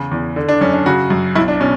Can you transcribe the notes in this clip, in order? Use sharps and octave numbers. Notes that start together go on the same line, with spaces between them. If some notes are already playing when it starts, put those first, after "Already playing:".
Already playing: E2 C#3
E2
D3
D4
F#2 C#4
D4
C#3 F#4
F#2
B1 E4
D4
B2 C#4